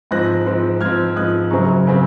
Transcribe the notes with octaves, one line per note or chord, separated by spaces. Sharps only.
G#2 F3 C4 F#6 A#6
G#2 F3 C4
G#2 F3 C4 F6 G#6
G#2 F3 C4 D#6 F#6
F#1 F#2 C#3 F#3 C4 A#5 C#6
C#3 F#3 C4